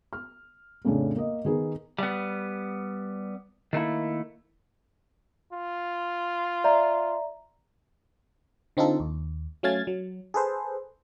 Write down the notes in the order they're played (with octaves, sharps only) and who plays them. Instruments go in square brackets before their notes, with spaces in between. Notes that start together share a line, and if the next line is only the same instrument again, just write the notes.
[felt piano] F6
F2 A2 C#3 C#4 D4
A#3 D#5
D#3 B3 G#4 A#4 B4
[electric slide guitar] G3 B3
D#3 A3 A#3 E4
[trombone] F4
[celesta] D5 E5 A#5
[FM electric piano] D3 C4 D#4 F4 A4
D#2
F#3 A3 C#4 F5 G#6 A6
F#3
G#4 A4 B4 C5